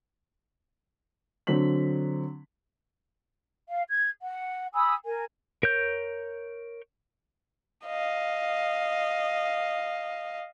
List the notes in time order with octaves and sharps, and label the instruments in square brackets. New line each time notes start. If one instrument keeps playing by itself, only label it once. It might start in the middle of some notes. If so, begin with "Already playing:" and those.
[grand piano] D3 F#3 C4 B6 F#7
[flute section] F5
G#6
F#5
G#5 B5 D#6 E6
A#4 G#5
[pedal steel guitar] A#4 C#5 G6
[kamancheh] D#5 F5